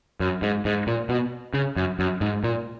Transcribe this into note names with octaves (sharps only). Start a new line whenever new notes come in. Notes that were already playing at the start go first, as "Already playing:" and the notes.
F#2
G#2
G#2
A#2
B2
C#3
F#2
F#2
G#2
A#2